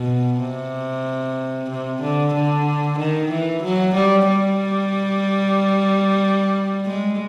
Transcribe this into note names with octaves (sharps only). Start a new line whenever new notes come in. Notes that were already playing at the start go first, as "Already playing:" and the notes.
Already playing: B2
C3
C3
D3
D3
D#3
E3
F#3
G3
G3
G#3